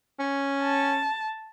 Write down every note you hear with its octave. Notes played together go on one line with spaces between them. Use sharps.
C#4
A5